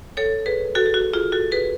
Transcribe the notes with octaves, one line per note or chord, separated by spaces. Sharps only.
A4 C#5
G#4 B4
F#4 A4
G#4
F#4
F4 G#4
F#4 A4
G#4 B4